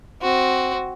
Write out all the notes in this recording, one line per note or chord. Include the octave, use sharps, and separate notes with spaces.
C4 F#4